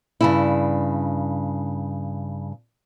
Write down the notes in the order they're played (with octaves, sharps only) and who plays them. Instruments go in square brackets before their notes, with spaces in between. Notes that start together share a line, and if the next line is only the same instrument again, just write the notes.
[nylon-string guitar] G2 C#3 E4